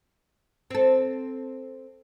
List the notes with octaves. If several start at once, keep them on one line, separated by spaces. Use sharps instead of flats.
C4 A4